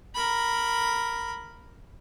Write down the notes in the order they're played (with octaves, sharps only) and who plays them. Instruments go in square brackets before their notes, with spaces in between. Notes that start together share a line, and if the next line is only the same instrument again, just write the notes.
[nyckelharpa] A#4 B5